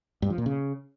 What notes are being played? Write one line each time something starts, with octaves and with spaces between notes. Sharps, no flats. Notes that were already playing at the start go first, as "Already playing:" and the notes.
G2
F3
A#2
C#3